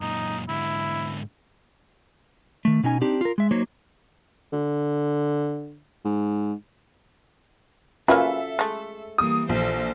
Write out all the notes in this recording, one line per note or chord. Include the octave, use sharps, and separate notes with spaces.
F#2 A#2 D#4
G#2 D3 E4
D#3 A3
B2 C#4 D#4 G#5
C4 D4 D#4 G4
F4 A#4
G#3 E5
F#3 A#3 D#4 C5 C#5
D3
G#2
A#3 C#4 F4 F#4 G#4 A4 B4 E5
G#3 A3
E3 G3 A#3 D#6
A#1 A4 C5